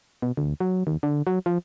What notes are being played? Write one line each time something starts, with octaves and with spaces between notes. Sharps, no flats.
B2
D2
F#3
D#2
D3
F#3
F3